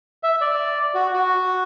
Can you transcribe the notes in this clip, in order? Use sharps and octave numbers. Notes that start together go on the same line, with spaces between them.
E5
D5
F#4
F#4